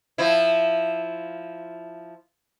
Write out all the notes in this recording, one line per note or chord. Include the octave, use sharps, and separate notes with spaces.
F3 E4